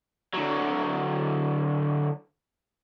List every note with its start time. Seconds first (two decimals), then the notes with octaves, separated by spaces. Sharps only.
0.34 D3 F#3